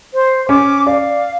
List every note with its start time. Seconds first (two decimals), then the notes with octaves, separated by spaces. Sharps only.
0.14 C5
0.49 C#4 D6
0.87 D5 F5